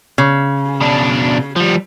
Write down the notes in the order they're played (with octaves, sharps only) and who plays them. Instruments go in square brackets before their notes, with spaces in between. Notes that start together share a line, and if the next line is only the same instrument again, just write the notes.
[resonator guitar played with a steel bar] C#3
[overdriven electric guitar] B2 D4
F3 G3